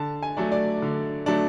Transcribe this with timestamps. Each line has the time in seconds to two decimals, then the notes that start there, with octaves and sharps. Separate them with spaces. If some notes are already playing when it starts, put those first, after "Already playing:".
Already playing: D3 A5
0.23 G#5
0.37 F#3 A3 D4
0.52 D5
0.82 D3
1.26 F#3 A3 D4